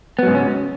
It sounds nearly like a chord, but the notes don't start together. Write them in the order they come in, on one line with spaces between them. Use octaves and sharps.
B3 F#3 G#2 C#3 C#4